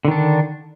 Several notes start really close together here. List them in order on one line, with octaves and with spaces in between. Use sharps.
D3 D#3 D4